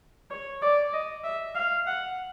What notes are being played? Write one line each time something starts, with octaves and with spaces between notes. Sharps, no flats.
C#5
D5
D#5
E5
F5
F#5